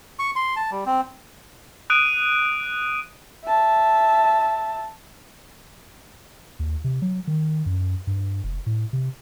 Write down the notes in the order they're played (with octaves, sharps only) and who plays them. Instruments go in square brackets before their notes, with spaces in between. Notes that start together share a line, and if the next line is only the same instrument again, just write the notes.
[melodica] C#6
C6
A5
G3
C4
[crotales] D#6 F#6 D7 D#7
[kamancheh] E5 A5
[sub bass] D#2
C3
F#3
D#3
F#2
G2
F1
A2
C3